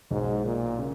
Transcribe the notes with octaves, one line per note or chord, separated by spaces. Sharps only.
B1 G#2 B2
A#2
C#3